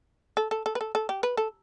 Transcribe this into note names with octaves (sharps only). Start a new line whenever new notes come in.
A4
A4
A4
B4
A4
A4
G4
B4
A4